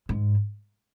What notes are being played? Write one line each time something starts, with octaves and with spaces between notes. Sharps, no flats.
G#2